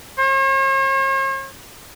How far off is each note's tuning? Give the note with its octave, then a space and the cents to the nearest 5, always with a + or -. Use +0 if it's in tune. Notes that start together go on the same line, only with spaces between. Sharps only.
C#5 -45